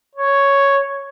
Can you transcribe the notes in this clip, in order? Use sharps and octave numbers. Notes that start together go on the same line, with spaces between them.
C#5